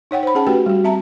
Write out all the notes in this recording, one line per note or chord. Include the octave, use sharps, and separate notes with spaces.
D#4 C#5 F#5 G5
C5 B5
C#4 G#4 F#5 A5
A3 F#4 G4 B4 G5
G3 F#4
C4 E5 A5 A#5